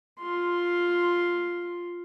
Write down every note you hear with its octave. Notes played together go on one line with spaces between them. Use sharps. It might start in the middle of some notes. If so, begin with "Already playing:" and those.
F4 C6